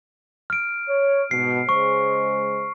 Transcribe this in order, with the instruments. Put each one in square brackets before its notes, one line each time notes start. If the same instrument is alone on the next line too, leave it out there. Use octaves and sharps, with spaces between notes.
[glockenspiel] F6 D7
[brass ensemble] C#5
[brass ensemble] G#2 B2 [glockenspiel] C7
[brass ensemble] C#3 G#3 C5 [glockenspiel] C#6